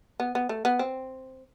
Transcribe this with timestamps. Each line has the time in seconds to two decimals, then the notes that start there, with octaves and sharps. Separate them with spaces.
0.20 B3
0.35 B3
0.49 A3
0.65 B3
0.79 C4